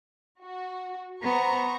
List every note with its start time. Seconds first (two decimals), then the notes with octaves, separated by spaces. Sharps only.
0.43 F#4
1.22 B3 C5 A#5 C#6